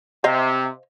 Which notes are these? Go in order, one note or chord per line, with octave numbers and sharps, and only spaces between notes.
C3 C5 D#5 F5